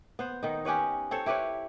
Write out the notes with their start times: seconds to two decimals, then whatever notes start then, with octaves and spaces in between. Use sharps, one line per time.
0.19 B3 C5
0.43 D#3 D#4
0.65 C#4 G4 B4 C#5
1.11 C4 A4 C5 C#5
1.26 E4 G4 B4 C#5